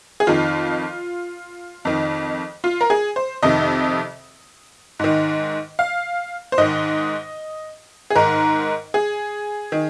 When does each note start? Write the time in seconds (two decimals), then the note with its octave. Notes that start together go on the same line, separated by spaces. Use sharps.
0.20 G#4
0.27 F2 D#3 F4
1.85 F2 D#3
2.64 F4
2.81 A#4
2.90 G#4
3.16 C5
3.43 F2 C3 D#3 D#5
4.99 G#2 D#3
5.79 F5
6.52 C5
6.58 G#2 D#3 D#5
8.10 G#4
8.15 G#2 D#3 A#4
8.94 G#4
9.72 D#3